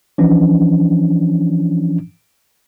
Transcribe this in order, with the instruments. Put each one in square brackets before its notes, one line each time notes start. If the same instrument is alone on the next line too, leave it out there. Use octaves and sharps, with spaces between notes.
[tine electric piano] E3 F3 C#4 D4